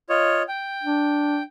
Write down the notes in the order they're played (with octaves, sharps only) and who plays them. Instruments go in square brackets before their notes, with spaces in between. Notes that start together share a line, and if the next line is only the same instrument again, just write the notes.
[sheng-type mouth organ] F4 C#5 D#5
G5
[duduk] D4